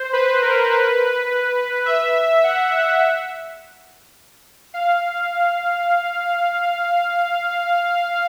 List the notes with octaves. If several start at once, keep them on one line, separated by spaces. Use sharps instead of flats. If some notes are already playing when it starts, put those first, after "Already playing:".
Already playing: C5
B4
A#4
B4
E5
F#5
F5